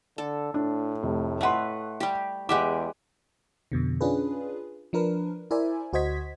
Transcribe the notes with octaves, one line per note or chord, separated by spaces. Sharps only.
D3 A4
A2 D4
F1
A3 B4 D#5 F#5 C6
G3 G4
E2 G#3 G4 E5 F#5 D6
F2 B2 D3
C#4 D4 F4 G#4 B4
F3 D4 A#4 B4
E4 A#4 C5 D5 E5 G#5
D2 F#4 C5 D#5 G#6 B6